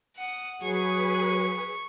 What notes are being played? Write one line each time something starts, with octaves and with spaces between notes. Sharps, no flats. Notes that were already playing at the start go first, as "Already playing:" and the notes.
F#5 D#6
F#3 G#4 B4 C#6